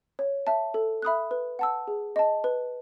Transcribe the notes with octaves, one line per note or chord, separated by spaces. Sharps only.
C#5
E5 A5
A4
E5 B5 D#6 F#6
B4
F#5 A5 E6
G#4
D#5 A5
B4